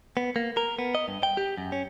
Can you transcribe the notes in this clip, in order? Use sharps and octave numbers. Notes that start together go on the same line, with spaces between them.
B3
A#3
A#4
B3
D#5
G2
G5
G4
F#2
C#4